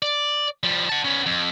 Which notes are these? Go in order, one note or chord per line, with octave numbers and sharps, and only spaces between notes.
D5
F3 G3
F#5 A5
B3 C#4
F2